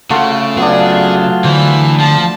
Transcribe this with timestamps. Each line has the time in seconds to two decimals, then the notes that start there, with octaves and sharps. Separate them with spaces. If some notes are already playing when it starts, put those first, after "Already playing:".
0.10 C#3 A3 F4 F#4
0.57 F#3 B3 D4 F4 G#4
1.44 D2 E3 C5
2.00 F3 A5